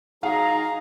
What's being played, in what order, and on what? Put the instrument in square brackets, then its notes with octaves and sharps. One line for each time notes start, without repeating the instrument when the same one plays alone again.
[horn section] F#3 G#4 [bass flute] D#4 [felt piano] F5 [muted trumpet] A#5